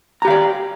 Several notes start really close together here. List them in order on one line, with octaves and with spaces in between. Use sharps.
A#5 G4 F5 D5